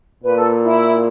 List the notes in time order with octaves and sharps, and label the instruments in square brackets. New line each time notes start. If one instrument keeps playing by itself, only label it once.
[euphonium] A#2 [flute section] B4
[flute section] A4
E4